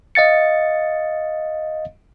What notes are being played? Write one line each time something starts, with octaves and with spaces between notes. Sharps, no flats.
D#5 F5 A6 C#7